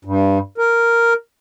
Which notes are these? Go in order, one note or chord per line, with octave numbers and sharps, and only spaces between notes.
G2
A#4